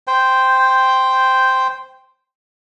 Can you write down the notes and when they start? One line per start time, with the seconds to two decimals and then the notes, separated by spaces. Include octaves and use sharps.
0.07 C5 G5